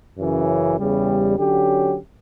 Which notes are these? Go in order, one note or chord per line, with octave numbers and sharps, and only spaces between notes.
F#2 C#3 E3
E2 C#3 G3
D3 F#3 C#4 G4